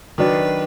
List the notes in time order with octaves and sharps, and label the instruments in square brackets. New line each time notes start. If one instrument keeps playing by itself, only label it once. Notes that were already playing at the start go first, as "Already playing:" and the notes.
[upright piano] D#3 F#3 D4 [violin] B4